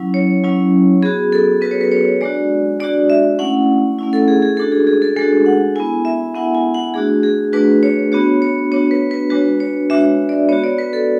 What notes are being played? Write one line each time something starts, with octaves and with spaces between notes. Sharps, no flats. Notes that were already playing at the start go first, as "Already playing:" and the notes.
Already playing: F#3 C#4 E4
C#5
F#3 C#4 E4
B3 F#4 G#4
A4
B3 F#4 B4
C#5
B4
C#5
G#3 D4 F#4 D5
G#3 D4 F#4 D5
E5
A3 C#4 E4 F#5
A3 C#4 E4
A4
G#4
G#4
G#3 D4 F#4 A4
G#4
G#4
A4
G#3 D4 F#4 A4
F#5
B3 E4 G#5
E5
B3 E4 F#5
G#5
F#5
A3 D4 F#4 G#4
G#4
A3 D4 F#4 B4
C#5
B3 D4 F#4 C#5
C#5
B3 D4 F#4 C#5
B4
B4
G#3 D4 F#4 B4
C#5
G#3 D4 F#4 E5
D5
B3 F#4 C#5
D5
B4
A4